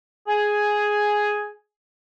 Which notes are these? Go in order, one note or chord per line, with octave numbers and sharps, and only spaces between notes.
G#4 G#5